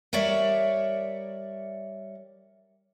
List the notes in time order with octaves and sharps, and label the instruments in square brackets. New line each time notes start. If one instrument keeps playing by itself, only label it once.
[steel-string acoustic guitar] G3 A#4 C#5 D5 E5